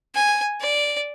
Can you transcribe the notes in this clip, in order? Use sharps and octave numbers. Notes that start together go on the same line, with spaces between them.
G#5
D5